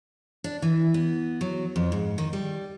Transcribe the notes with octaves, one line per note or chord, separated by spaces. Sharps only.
D4
E3
B3
F#3
F2
G#2
D#3
G3